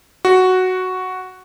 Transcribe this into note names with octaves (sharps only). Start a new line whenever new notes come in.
F#4